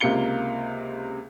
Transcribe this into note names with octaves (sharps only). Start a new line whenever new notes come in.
C#2 C3 A#3 F4 C#7 G7